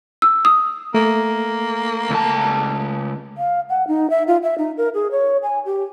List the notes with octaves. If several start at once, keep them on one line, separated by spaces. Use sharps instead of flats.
E6
D#6
A3 A#3
C#2 A5
F5
F#5
D#4
E5
F4
E5
D#4
A#4
G#4
C#5
G#5
G4